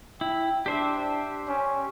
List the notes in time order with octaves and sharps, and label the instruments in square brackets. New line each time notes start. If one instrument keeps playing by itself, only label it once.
[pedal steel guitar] E4 [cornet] G5
[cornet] D4 [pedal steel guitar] G4 C5 E5
[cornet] C#4